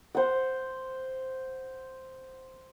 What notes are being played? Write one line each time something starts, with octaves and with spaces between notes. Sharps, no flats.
C5 F#5